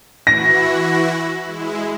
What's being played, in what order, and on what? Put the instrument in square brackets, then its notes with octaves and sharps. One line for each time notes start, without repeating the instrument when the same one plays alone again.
[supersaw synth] E3 E4 F#4 [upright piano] A#6
[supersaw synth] G#3 E4